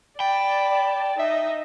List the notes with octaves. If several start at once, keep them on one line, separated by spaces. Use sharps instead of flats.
D5 G5 A5 B5
D#4 D#5 E5